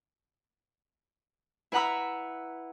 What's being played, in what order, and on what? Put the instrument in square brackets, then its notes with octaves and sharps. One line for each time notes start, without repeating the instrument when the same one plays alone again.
[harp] E4 B4 F#5 A#5 B5 E6